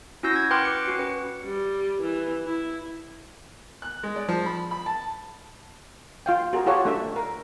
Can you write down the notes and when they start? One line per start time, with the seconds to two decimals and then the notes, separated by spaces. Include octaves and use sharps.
0.23 C#4 E4 F#4 E6 G6 A#6
0.36 G#6
0.51 B4 G5 C6 D6 F6 F#6
0.65 D6 C#7
0.86 C#4 F#4 C#7
0.99 B4
1.43 G3
2.01 E3
2.45 E4
3.82 F#6
4.03 G#3
4.16 D5
4.29 F3
4.46 B5
4.71 B5
4.86 A5
6.26 F4 F5 G5
6.53 F#4 G#4 A#4
6.66 F4 G4 A4 C#5 F#5
6.85 A3 D4 E5
7.16 A#4